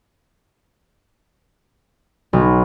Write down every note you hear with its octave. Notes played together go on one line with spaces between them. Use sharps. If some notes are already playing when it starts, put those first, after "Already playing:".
B1